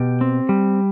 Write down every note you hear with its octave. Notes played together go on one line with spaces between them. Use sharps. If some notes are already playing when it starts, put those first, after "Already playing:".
Already playing: B2 G4
C4
G3